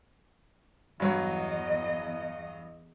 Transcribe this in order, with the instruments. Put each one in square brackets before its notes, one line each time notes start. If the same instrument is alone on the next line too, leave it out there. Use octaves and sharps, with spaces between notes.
[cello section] E2 D#5 [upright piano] G2 F#3